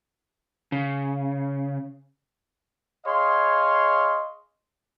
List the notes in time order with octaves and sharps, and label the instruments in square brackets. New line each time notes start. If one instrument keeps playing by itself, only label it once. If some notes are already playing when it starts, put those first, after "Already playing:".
[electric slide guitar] C#3
[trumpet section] G#4 C#5 D#5 F5 C6